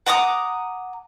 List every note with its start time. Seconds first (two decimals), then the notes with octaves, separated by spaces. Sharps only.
0.06 F#5 A#5 D6 D#6